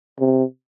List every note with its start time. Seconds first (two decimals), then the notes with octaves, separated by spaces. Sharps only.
0.20 C3